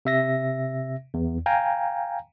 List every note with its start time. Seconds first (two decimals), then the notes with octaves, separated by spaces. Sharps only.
0.05 C3 E5 A#6
1.14 E2
1.46 F5 G5 G#5 A#5